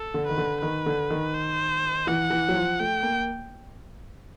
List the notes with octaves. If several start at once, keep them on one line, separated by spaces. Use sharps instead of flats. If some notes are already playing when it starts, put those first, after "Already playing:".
Already playing: A4
D3
D#3 B4
D3
D#3 B4
D3
D#3
C5
E3 F#5
E3
F#3
F3
A3 G5
A#3